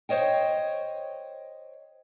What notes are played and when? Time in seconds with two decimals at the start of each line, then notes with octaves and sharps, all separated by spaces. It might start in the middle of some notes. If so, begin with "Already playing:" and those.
0.09 C5 C#5 D#5 G5